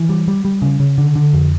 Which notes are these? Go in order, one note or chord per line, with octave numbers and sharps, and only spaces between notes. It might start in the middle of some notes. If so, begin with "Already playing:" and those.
Already playing: E3
G3
G3
G3
C#3
C#3
D3
D3
F2